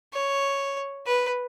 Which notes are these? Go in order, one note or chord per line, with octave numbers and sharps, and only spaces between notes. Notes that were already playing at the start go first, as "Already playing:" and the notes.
C#5
B4